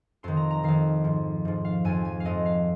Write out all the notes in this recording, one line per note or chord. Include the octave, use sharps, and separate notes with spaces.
F2 D#3 C6
A#5
A#5
F2 D#3 F5
G#2 F3
G#2 F3
F5
F2 F3 G#5
G#5
F5
F2 F3 D#5
F5